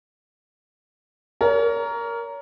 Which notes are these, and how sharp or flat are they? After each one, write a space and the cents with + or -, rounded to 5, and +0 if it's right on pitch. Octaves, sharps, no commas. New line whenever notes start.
A#4 +0 C#5 +40